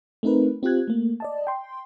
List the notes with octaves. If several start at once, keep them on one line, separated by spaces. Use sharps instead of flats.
A3 C4 D#4 A#4 B4
C4 F4 G4 F#6 G#6
A3 A#3
D5 D#5 A5
G5 C6